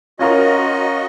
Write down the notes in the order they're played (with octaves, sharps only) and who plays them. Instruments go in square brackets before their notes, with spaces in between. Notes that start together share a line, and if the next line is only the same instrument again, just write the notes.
[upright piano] C#4 F4 A#4 [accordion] F#4 D#5